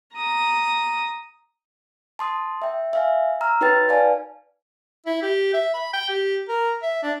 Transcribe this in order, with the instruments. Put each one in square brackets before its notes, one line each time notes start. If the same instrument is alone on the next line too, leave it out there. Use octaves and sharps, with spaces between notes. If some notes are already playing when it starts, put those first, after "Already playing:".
[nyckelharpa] A#5 D#6
[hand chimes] A5 C6 D#6
E5 G5
E5 F5 G#5
A#5 E6 F6
D#4 F#4 B4 C#5 G5 A6
B4 D5 F5 G#5 A5
[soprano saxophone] E4
G4
E5
B5
G5
G4
A#4
E5
D4